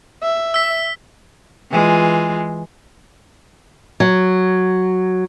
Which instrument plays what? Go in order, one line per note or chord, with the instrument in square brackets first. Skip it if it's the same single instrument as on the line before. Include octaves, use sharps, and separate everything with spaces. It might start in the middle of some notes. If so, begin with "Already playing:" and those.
[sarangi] E5
[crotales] E6 B6
[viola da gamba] E3 G#3 F4
[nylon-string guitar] F#3